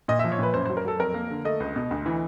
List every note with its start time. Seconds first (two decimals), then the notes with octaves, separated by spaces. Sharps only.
0.08 A#2 D#5
0.19 F3 E5
0.32 C#5
0.39 A#2 B4
0.54 F#2 C5
0.66 F#3 C5
0.77 A#4
0.85 F#3 A4
1.00 F2 A#4
1.14 A#3
1.31 D3
1.45 A3 D#5
1.60 C#2
1.76 B2
1.91 D2
2.06 E3